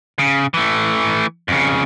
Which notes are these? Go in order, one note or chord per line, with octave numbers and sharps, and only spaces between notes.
C#3
E3 A3
F2 C#3